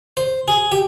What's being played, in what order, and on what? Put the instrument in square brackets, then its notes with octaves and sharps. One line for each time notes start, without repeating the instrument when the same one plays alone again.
[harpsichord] C5
G#4
G4